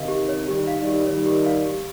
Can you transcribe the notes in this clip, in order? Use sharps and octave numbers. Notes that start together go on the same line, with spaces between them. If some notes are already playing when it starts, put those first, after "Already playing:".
Already playing: C3 D#3 F5
G4
C#5
D#3 G3 G4
F5
D#3 G3
G4
D#3 G3 C#5
G4
F5
G4